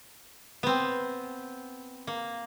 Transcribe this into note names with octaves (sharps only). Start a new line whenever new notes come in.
B3 C4
A#3